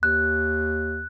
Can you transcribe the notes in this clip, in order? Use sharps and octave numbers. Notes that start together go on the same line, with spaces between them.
D#2 F#6